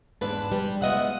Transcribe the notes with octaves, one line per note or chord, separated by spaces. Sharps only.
E2 G#2 D4 B4 A5
G3
G#3 B3 F4 D#5 E5 F#5